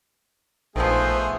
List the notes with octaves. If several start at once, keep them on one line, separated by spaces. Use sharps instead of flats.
A#1 D#3 F3 A3 B3 G#4 C5